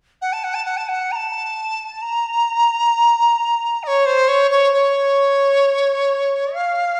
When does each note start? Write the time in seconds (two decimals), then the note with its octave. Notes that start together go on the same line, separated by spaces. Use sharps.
0.21 F#5
0.32 A5
0.43 F#5
0.54 A5
0.65 F#5
0.77 A5
0.88 F#5
1.11 A#5
1.15 A5
2.01 A#5
3.83 D#5
3.87 C#5
4.05 C5
4.28 C#5
4.51 C#5
4.73 C#5
6.54 F5